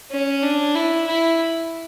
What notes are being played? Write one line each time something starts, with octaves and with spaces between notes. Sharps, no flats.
C#4
D4
E4
E4